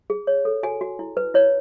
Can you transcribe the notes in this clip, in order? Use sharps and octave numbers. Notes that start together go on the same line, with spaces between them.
G#4
C#5
A4
F#4 G#5
F#4
E4
B4
E4 C#5